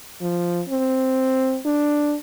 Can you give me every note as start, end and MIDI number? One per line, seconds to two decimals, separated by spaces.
0.21 0.61 53
0.69 1.59 60
1.66 2.15 62